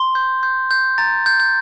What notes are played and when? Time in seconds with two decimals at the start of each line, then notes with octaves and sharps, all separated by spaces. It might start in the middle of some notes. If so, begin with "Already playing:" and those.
Already playing: C6
0.15 G6
0.43 G6
0.71 G6
0.98 A#5 A6
1.26 G6
1.40 G6